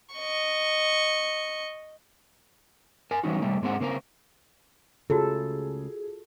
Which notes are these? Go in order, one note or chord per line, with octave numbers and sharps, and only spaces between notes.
D#5 C#6
A#4 G#5
E3 F#3 G3 C#4 D#4 F#4
A2 C3 G3 A3 A#3
G#2 G#3 A#3 C4 F#5
C#3 A#3 C4 A#4
C#2 C#3 A3 F4 F#4 G#4 A4